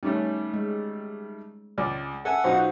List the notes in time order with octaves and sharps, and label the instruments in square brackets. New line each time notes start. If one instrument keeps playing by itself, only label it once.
[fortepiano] D#3 G3 A3 [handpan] C#4
[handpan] G#3
[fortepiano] C#2 [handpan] D5
[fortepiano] A4 E5 G#5 [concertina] F#5
[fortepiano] B1 D#4 F4 [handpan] F#4 C5